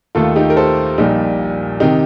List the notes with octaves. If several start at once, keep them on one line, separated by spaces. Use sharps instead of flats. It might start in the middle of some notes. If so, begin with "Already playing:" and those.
D#2 D#3 A3 F4 A4
D#4 G4
A#4
A4 C5
A#1 A#2 G3 D#4 G4
C3 D#3 D#4 G4